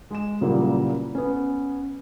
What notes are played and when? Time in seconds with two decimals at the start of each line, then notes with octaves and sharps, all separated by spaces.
0.10 G#3 G#5 E7
0.41 A#2 C#3 E3 F#3 G3 A#3
1.15 B3 C#4